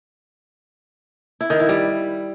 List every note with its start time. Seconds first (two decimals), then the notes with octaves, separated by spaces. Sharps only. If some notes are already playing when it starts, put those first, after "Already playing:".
1.41 E4
1.50 D#3
1.59 E4
1.69 G3